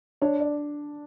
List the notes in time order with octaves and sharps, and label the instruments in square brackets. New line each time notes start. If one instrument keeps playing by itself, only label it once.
[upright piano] D4 [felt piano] C#5
[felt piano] D5